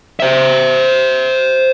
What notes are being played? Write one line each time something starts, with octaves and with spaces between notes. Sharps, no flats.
C5 E5